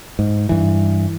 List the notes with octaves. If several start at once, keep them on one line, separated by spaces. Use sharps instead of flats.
G#2
G2 E3